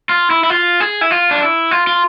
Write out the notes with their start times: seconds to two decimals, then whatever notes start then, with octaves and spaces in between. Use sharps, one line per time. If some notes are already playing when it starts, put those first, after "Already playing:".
0.09 F4
0.30 E4
0.44 E4
0.50 F4
0.80 G#4
1.01 E4
1.11 F4
1.31 D4
1.41 E4
1.71 F4
1.87 F4